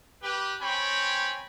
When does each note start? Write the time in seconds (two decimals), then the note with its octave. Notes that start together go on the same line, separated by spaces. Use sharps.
0.22 G4 B4
0.59 C4 C#5 G5 G#5 B5